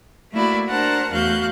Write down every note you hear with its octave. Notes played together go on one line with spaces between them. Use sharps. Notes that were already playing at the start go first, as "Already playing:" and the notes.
A3 A#3 E4 F#4 D5 B5
D4 A#4 C5 F#5 A5 A#5
E2 A3 F#4 F5 F#6 G6